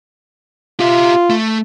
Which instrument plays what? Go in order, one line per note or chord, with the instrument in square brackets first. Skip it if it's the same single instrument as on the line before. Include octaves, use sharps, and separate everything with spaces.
[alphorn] F4 [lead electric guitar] G4 E5
[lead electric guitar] A3